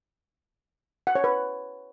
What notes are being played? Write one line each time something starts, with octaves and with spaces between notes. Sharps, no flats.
F#5
C#5
B4